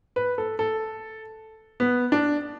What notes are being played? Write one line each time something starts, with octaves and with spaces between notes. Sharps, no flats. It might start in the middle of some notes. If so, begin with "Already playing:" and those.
B4
A4
A4
B3
D4